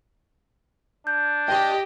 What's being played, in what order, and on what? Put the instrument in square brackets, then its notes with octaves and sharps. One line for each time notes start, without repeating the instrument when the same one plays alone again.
[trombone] D4 [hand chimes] G6
[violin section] G4 D#5 [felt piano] G5